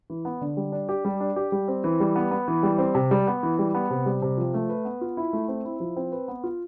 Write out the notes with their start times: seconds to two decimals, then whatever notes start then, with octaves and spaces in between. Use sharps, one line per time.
0.10 E3
0.25 B3
0.41 D3
0.57 G3
0.72 D4
0.89 G4
1.05 G3
1.20 D4
1.36 G4
1.52 G3
1.68 C4
1.84 E3
2.00 G3
2.16 B3
2.31 B3
2.48 E3
2.63 G3
2.78 C4
2.95 C3
3.11 G3
3.27 B3
3.43 E3
3.59 G3
3.74 B3
3.90 C3
4.06 G3
4.22 C3
4.38 F3
4.54 A3
4.69 B4
4.85 B3
5.01 F4
5.17 E4
5.33 A3
5.48 C4
5.65 E4
5.80 F3
5.97 C4
6.12 B4
6.28 B3
6.44 F4